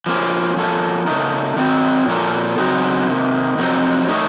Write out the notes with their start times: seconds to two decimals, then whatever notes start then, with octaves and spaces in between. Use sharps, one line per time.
0.06 F3 A#3 C#4
0.56 F3 A#3 C#4 A4
1.06 C#3 A3 D#4 A#4
1.56 D#3 F#3 C4 D#4
2.07 A#2 F3 A#3 C#4 A4
2.58 C#3 F#3 C4 D#4 F#4
3.07 C3 D#3 A#3
3.58 F2 C3 F#3 C4 D#4
4.08 A3 D#4 A#4 C#5